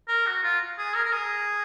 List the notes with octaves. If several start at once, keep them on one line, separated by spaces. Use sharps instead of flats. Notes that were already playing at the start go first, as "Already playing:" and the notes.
A#4
F#4
F4
G#4
A#4
A#4
G#4